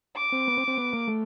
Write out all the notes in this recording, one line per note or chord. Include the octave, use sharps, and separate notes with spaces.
D6
C4
B3
C4
C4
B3
A#3
A3